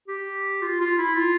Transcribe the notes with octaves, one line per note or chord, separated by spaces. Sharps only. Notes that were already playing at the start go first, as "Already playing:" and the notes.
G4
F4
F4
E4
F4